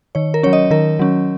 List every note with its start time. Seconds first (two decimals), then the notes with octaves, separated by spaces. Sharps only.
0.15 D#3 C#5
0.34 A#4
0.43 F#3 C#4 C#5
0.53 D#5
0.71 D#3 A#4
0.99 F#3 C#4